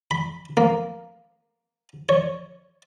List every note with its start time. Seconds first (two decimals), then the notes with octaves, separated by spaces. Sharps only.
0.11 B5
0.57 A#3
2.09 C#5